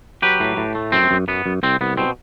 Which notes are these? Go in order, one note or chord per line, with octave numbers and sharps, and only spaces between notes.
F#3 G4 B4
A2
A2
A3
F#2 C4
F#2
F#2 B3
F#2
C2 C4
C2 B3
B2 C4